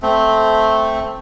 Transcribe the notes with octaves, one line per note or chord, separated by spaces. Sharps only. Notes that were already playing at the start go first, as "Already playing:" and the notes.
A3 C4